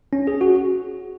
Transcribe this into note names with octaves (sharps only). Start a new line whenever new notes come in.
C#4
G#4
F#4